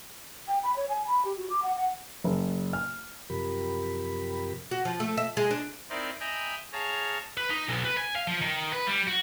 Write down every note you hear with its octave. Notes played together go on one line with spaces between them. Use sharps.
G5
B5
C#5
G#5
B5
G4
F#4
D6
F#5
F#5
F#1
F6
F#2 C3 F3 G4 A#4 B5
F#4
F3
A3
E5
G#3
D4
C4 D#4 E4 A#4 C5 D5
D#5 E5 G5 G#5 A#5 B5
G#4 C#5 F5 A5 A#5
B4
D#4
B1
B4
G#5
F5
F3
D#3
B4
G3
F#4